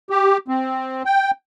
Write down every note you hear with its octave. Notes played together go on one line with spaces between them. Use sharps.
G4
C4
G5